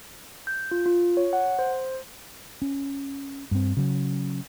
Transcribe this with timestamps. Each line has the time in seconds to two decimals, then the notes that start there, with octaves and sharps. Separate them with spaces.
0.47 G6
0.71 F4
0.86 F4
1.17 C#5
1.33 F#5
1.59 C5
2.62 C#4
3.51 G2 C4
3.77 C#3 F#3